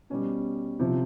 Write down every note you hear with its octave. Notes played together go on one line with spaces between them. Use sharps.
B2 G3 C#4
C3 F3